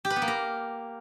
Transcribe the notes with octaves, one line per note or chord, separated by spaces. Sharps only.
G4
B4
B3
A#3
A#4